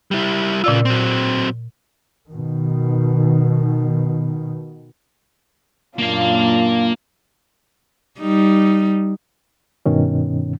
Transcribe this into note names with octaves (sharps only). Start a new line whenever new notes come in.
G3 E4
A#2 C#3 F4 D5 E6
F#3 C4
B2 D#3
F#2 A#2 A#3 D4 F4 F5
G3 D#4
G2 B2 D#3 C#4